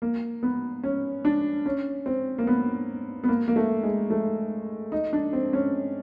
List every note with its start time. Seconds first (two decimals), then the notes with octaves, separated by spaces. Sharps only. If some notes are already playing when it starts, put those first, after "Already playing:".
0.02 A#3
0.43 B3
0.84 C#4
1.25 D4
1.66 C#4
2.06 C4
2.38 A#3
2.47 B3
3.24 B3
3.28 A#3
3.48 A#3
3.56 A3
3.83 G#3
4.10 A3
4.92 D#4
5.13 D4
5.33 C4
5.53 C#4